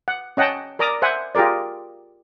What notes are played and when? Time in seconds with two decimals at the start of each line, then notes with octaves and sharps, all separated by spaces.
0.08 F#5
0.37 C#4 D#5 F#5 G5 A5
0.79 A#4 D5 A#5 D6 D#6
1.02 C5 E5 F#5 G#5
1.35 F4 G4 G#4 A#4 D5